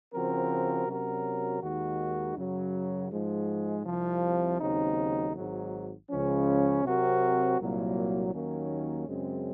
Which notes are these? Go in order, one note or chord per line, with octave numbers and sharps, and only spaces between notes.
C#3 F3 C4 F#4 A#4
C3 F#3 C#4 F#4 A#4
D#2 D#3 G#3 D#4 F#4
F#2 C#3 F#3
G#2 F3 G#3
C2 C3 F3
D#2 C#3 F#3 C4 D#4
G#1 G#2 F#3
C#2 C#3 F3 G#3 C#4
C3 F#3 C4 F#4 A#4
C2 A#2 F#3 A#3
D#2 D#3 F#3 A#3 C#4
F#2 C#3 G#3 C4